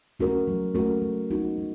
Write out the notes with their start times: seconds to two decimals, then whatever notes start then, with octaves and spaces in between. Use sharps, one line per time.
0.20 A3 C#4 F#4 A#4
0.48 F#3
0.74 A3 C#4 F#4 A#4
1.02 G#3
1.31 B3 D#4 F#4
1.58 G#3